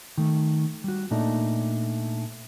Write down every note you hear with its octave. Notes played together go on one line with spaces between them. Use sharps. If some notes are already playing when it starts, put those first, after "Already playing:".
D#3 A3
G3 F#4
A#2 A3 D4 D#4